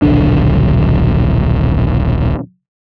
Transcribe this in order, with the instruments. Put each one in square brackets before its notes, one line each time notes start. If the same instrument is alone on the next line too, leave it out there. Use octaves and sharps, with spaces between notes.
[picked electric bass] D#1 B1 D3 D4